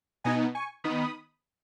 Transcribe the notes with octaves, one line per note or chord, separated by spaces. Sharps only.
B2 B3 D#4 D#5 G#5
G#5 C#6
D#3 B3 D#4 B5 D#6